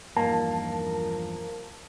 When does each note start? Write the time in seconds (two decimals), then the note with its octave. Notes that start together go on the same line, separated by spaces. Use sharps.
0.17 E2 G2 F3 A#3 D#4 A#4 A5